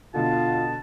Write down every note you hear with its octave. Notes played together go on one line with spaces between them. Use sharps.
B2 D3 F4 A5